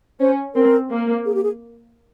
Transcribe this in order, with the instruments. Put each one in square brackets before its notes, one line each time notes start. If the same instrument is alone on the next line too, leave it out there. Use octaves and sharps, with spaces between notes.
[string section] C#4 [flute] C5
[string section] C4 [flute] A#4
[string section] A#3
[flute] G#4
G4
G#4